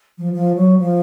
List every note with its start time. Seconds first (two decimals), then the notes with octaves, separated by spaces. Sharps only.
0.18 F3
0.33 F3
0.56 F#3
0.78 F3